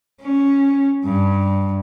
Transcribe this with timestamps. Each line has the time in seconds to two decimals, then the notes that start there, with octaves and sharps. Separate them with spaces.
0.21 C#4
1.05 G2